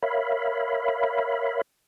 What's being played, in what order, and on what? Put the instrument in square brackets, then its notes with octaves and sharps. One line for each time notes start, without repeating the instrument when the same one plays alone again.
[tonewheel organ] A#4 C#5 E5 F5 B5